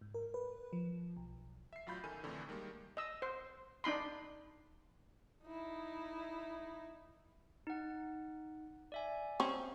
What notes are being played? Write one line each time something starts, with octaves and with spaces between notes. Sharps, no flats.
G#2
A#4
B4
F3
B1
E5 C7
A1 F#3 F4 B5 G6
B1 D#3 A4 G#5 G6 D#7
F2 A2 D3 E3
D#3 G3 G#3 A#3
D#5 E6
C5
D4 D#4 B5 C6
D#4 E4
D#4 F#5
D5 E5 G#5
C4 C#4